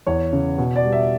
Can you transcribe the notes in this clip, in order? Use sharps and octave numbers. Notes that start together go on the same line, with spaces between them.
E2 C#5
C#3
B2
D5
G3
E5